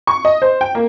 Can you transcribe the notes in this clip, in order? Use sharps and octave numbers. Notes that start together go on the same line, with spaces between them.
C#6
D#5
C5
G5
A#3